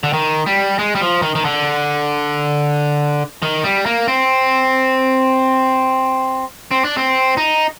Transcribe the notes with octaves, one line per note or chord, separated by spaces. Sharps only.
D3
D#3
G3
G#3
G3
F3
D#3
D#3
D3
D#3
G3
A#3
C4
C4
D4
C4
D#4